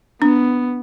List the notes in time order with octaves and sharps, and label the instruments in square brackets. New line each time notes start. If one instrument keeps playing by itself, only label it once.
[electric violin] B3 [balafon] D4